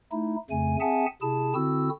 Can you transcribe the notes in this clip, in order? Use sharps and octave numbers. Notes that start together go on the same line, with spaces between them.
A3 D#4 E4
F2 C#3 A3 G#5
C4 G#4 E5 F#5 G#5 A5
C3 E4 G#4 A5
D3 C4 E4 F#4 E6